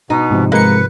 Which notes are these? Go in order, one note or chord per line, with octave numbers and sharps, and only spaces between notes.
B2 D#4
G#2 C3 F3
G#3 A#3 B4 C#7